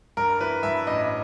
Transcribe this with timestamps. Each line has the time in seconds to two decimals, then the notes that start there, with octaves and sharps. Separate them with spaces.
0.17 G2 A#4
0.40 E3 B4
0.63 G2 E5
0.87 A1 D#5